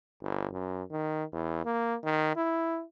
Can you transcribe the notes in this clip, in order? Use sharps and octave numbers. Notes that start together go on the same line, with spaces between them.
G1
F#2
D#3
E2
A#3
D#3
E4